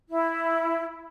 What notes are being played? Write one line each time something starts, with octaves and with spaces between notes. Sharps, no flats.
E4